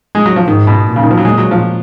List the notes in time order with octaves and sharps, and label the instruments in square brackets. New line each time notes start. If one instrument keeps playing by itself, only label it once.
[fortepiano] G#3
F#3
F3
[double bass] G#2 [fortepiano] D#3
[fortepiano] B2
[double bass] A#2
[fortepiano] C#3
D#3
F3
F#3
[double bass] A#2 [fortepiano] G#3
[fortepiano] F#3
F3